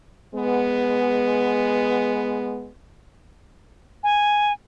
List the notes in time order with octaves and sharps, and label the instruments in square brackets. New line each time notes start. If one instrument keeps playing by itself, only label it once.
[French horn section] G#3 B3
[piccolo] G#5